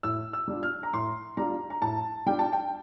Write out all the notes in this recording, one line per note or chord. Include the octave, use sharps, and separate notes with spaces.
A2 E6
E6
G3 D4 F4
F6
A#5
A2 C6
G3 D4 F4 A#5
A#5
A2 A5
G3 D4 F4 G5
A5
G5